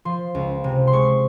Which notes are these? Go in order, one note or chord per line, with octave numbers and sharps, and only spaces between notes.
F3 C6
C#2
C3
C6
G#3 C#6